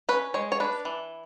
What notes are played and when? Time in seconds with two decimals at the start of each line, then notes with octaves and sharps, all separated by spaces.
0.09 C#4 B4
0.34 G#3 C#5
0.52 C#5
0.60 D4 B4
0.85 E3